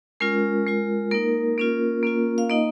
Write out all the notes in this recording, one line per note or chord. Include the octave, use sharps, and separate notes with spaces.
G#3 C#4 F4 A#4
G#3 F4
A#3 D#4 A#4
A#3 C#4 F4
A#3 C#4 F4
F5
A#3 D#4 D#5